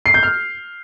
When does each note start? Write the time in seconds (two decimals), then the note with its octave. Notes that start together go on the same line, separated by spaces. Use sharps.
0.06 C7
0.14 G6
0.23 F6